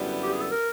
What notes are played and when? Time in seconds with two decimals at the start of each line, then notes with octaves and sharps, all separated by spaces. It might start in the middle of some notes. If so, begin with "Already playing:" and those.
Already playing: F#2 D3 G3 B3 E4
0.23 G4
0.33 G#4
0.41 A4
0.51 A#4